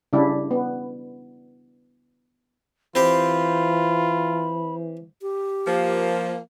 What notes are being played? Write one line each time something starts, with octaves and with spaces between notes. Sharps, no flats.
C#3 G3 D4 E4
B3
E3 C4 F4 G4 B5
G4
F3 A#3